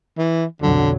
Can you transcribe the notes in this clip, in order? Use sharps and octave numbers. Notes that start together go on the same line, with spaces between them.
E3
B1 F2 D3 F#3